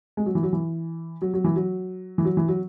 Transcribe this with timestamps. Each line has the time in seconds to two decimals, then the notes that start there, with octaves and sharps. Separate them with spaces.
0.17 G#3
0.26 F#3
0.35 E3
0.43 F#3
0.53 E3
1.22 F#3
1.34 F#3
1.44 E3
1.56 F#3
2.18 E3
2.25 F#3
2.37 E3
2.48 F#3